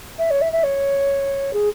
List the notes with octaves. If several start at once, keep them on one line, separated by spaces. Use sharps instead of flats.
E5
C#5
E5
E5
C#5
G#4